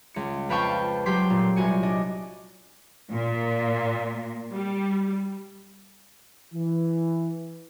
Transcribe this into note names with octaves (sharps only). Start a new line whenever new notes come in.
C#2 C#7
F2 B4 F5 G5 A5 C#6
F#3 G4 G5 C6 B6 C7
A#2
C2 F#4 G#5 C#7
D4 D#5
A#2
G3
E3